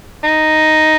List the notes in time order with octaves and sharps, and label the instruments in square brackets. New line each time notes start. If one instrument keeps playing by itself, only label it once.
[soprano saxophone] D#4